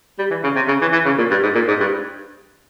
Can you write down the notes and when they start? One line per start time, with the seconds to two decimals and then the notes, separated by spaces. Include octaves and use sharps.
0.19 G3
0.30 E3
0.44 C#3
0.55 C3
0.68 C#3
0.81 E3
0.92 E3
1.05 C#3
1.18 A#2
1.31 G2
1.43 G#2
1.55 A#2
1.68 G#2
1.80 G2